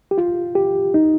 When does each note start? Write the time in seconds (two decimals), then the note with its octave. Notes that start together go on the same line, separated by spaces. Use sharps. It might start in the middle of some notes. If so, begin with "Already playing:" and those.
0.11 G4
0.18 F4
0.55 G4
0.94 D#4